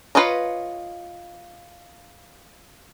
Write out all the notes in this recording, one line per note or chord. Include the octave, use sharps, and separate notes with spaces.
F4 B4 C#5 D#5 A#5